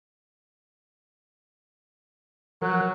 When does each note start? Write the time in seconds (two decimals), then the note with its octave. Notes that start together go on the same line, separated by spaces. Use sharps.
2.62 F3 F#3 A#4 F#6